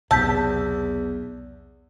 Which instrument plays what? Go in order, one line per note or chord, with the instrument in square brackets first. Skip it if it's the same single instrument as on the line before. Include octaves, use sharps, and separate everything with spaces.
[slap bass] B1 C3 B3 [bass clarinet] E2 [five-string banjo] A5 [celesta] E6 G6 B6